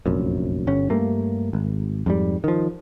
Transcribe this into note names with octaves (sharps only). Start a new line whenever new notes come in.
F1 A#1 F#2
G1 C#4
G2 A3 A#3
G#1
F2 G#2 G3
D#3 F3